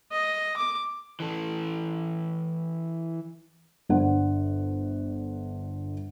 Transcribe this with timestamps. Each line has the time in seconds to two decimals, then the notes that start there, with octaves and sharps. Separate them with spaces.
0.12 D#5
0.57 D6
1.20 E3 A4
3.89 G1 D4 C5 F#5